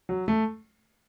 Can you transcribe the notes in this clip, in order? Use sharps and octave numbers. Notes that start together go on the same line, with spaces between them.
F#3
A3